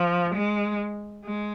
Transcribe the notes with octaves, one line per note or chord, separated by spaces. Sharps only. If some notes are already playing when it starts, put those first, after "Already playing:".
Already playing: F3
G#3
G#3